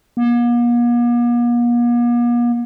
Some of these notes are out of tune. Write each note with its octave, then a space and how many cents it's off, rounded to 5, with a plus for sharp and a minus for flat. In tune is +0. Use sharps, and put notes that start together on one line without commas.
A#3 +45